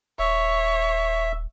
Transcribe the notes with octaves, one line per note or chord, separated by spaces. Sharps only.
D#1 C#5 E5